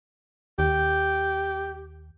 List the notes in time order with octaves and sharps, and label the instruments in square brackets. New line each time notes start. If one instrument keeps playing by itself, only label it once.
[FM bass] D#2 [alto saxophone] G4